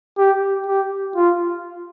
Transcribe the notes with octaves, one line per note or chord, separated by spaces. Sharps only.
G4
G4
F4